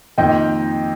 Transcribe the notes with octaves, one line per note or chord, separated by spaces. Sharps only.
F2 D#3 A#3 D#5 G5